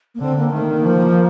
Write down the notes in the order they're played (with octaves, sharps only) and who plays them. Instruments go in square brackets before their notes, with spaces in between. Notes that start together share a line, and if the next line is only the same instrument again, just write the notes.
[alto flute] A#3
[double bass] D3 [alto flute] C4
[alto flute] A#3
[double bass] D#3 [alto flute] A3
[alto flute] A#3
[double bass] F3